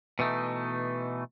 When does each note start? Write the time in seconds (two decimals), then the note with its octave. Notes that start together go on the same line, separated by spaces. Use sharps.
0.19 B2 E3 A3 D#4